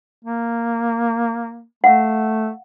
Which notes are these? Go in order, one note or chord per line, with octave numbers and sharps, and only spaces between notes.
A#3
A3 F5 F#5